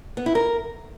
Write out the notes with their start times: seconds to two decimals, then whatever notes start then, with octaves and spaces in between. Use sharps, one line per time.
0.17 B3
0.26 E4
0.35 A#4